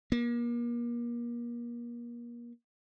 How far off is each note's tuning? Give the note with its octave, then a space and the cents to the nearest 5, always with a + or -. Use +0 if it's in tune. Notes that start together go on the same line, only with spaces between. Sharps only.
A#3 +35